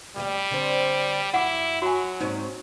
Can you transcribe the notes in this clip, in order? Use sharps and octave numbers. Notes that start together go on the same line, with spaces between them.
D2 G3 E4 G4
D3 C4
F#2 E4 F#5 D6
F#3 F#4 G#5
G#2 C4 C#4 D#4